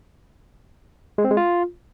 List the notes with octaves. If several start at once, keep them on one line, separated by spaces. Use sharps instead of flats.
G#3
C4
G#3
F4